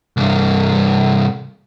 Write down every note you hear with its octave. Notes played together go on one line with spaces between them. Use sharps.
C2 G2